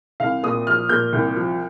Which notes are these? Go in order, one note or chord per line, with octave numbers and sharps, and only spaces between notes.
C2 F5
A#2 D#6
F3 F6
A#2 G6
C2
F3